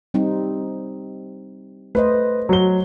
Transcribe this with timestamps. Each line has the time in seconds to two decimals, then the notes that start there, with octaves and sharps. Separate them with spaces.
0.14 G3 C4 D#4
1.95 A3 B4 C5 D#5
2.49 F#3 G7